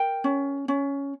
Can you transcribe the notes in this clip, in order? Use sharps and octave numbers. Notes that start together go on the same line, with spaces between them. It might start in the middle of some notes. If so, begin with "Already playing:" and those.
Already playing: A#4 G5
C#4
C#4